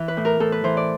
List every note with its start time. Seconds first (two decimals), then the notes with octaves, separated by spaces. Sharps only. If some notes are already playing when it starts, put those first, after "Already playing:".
Already playing: E3
0.08 B4
0.17 A2
0.25 A#4
0.40 A2 A4
0.52 B4
0.64 E3 C5
0.77 D5